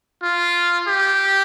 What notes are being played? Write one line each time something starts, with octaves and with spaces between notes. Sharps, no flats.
F4
G4